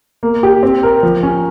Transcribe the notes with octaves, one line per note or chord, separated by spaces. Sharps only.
A#3
G4
C4
A#4
F3
C#4